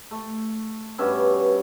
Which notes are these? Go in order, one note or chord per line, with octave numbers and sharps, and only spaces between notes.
A3
G2 B2 C#4 E5